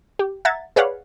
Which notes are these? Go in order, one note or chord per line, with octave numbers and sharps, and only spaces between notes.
G4
E5 F#5 A#5 G#6 A6
G#4 B4 C#5 D5 F5 F#5